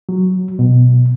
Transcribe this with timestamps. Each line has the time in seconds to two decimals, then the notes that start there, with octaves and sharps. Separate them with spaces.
0.09 F#3
0.59 B2